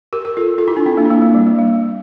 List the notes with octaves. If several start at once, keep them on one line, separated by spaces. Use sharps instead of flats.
G4 A#4
G4 A#4
F4 A4
F4 A4
E4 G4
D4 F4
C4 E4
A#3 D4
E4
A#3 D4
A#3
G3
A#3
A#3